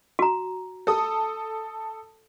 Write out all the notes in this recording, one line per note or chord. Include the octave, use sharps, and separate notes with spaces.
F#4 A#5
A4 A5 D#6